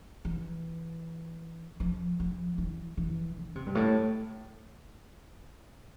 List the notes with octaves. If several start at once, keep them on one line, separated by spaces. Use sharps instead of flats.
E3
F3
F3
E3
E3
D3
C3
G2
A2